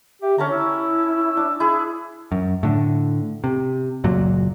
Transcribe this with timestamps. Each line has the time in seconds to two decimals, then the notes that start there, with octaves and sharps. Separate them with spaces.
0.22 G4 E5
0.38 D3 C#4 A5 A#5
0.51 E4 E6
1.37 D4
1.60 E4 G#4
2.32 F#2
2.63 A2 D3
3.44 C3
4.04 F#1 C#2 A#2 F#3